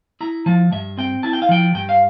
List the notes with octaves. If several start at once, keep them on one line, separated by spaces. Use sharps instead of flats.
E4 A#5
F3 A5
G2 E5
C4 G5
E4 A5
G5
F5
F3 G5
G2 G5
F5